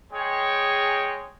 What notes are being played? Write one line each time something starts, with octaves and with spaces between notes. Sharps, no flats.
G#3 G#4 C#5 G5